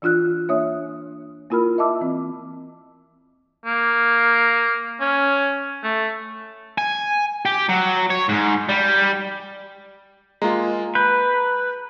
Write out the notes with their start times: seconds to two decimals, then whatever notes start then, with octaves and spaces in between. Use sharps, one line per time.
0.02 E3 D4 F4 F6 F#6
0.49 A#3 D4 C#5 E5 D#6
1.50 A#3 E4 F4 A#4 B5 F6
1.78 D#5 E5 A5 D6 E6
2.01 E3 C4
3.66 A#3
5.01 C#4
5.83 A3
6.78 G#5
7.45 G4
7.69 F#3
8.10 C#5
8.29 G#2
8.69 G3
10.42 G#3 A#3 F4 A#5
10.95 B4 G6